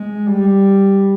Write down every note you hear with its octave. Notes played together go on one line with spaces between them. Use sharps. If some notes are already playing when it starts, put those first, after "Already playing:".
Already playing: G#3
G3